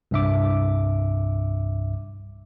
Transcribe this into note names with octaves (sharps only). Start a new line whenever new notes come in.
C2 G2 E5 D6